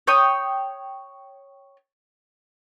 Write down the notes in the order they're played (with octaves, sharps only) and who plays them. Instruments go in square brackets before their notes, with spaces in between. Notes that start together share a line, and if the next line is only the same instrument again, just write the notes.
[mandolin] C#5 G5 D#6